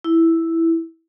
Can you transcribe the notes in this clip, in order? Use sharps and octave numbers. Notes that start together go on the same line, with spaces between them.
E4